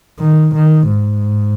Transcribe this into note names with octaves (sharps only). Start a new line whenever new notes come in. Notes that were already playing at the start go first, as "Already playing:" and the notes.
D#3
D#3
G#2